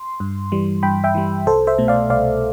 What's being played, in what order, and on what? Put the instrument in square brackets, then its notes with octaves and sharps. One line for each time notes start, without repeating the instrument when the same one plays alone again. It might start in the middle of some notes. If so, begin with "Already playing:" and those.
Already playing: [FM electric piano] C6
G2
E3 G3
G2 G5 B5
E5 G5
E3 G3
C2 A4 C5
C5 E5
B2 A3
D5 F5
C2 D5 F5